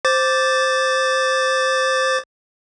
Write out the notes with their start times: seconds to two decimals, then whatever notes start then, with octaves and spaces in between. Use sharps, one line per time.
0.05 C5 D6 A6